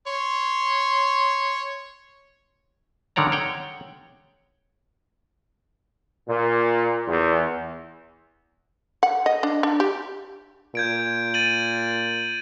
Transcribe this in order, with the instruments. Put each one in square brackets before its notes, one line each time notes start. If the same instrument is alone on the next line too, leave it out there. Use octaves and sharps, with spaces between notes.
[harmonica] C#5 C6
[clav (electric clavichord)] D3 D#3 C#5 D5 A#5
C#5 F#5 G5
[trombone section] A#2
E2
[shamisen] F#5
D#5
D4
D4
G4
[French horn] A#2 [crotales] G6 G#6 D7
[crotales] A6 D#7 F#7